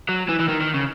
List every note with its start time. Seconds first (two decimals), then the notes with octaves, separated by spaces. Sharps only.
0.09 F#3
0.29 E3
0.39 E3
0.48 D#3
0.61 D#3
0.74 C#3